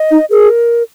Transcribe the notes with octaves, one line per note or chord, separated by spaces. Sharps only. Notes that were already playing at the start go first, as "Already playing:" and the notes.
Already playing: D#5
D#4
G#4 A#4